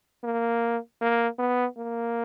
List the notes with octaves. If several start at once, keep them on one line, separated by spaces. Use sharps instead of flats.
A#3
A#3
B3
A#3